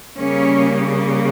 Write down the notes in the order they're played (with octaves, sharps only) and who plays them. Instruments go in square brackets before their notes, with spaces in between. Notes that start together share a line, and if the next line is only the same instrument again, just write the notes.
[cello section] C#3 G3 A#3 C#4